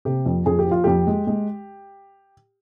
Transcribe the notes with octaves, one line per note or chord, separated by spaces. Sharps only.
C3 G4
F2
F2 G#4
G4
F3 F4
F2 G4
G#3
G#3